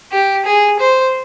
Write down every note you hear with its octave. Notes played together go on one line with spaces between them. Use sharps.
G4
G#4
C5